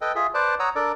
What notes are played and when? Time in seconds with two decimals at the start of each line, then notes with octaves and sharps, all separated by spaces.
0.01 A4 B4 D#5 G5
0.15 F4 G#4 E5
0.34 B4 C5 D5 A5
0.59 C#5 F#5 A#5 D#6 E6
0.75 D4 A4 A#4 D5